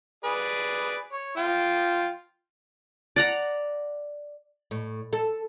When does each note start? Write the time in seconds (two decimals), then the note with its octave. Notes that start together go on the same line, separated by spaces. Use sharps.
0.25 G#4 B4 D5
1.13 C#5
1.37 F4 G5
3.16 D5 F#5 A#5
4.71 A2
5.13 A4